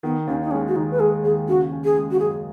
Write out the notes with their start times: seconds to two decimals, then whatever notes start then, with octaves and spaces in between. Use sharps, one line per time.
0.03 D#3 B3
0.27 D#2 C#4
0.42 D#4
0.51 G#3 C#4
0.68 F#4
0.76 D#2 D#4
0.91 B4
0.99 G#3 G#4
1.23 D#2 G#4
1.48 C#3 F#4
1.72 C#4
1.84 G#4
1.96 G#3
2.11 F#4
2.20 F#2 G#4